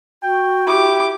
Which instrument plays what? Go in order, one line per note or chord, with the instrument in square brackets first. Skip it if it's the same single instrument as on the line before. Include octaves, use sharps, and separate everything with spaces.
[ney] F#4 [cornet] G5
[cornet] E4 [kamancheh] G4 D6